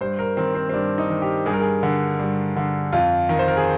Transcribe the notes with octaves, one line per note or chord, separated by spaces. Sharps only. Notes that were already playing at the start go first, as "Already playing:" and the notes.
G2 C5
A#4
D#3 C4
C4
C4
G2 D4
D#4
D#3
G4
G2 G#4
A#4
G#4
D3
G2
D3
F2 F4
D#3
C5
A#4
G#4